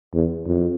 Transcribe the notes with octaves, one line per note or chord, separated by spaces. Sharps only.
E2
F2